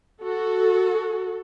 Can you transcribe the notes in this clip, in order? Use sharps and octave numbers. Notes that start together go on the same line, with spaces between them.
F#4 A4